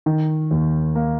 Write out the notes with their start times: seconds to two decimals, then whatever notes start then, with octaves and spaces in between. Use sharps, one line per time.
0.06 D#3
0.51 D#2
0.95 A#3